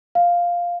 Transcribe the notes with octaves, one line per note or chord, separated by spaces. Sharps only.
F5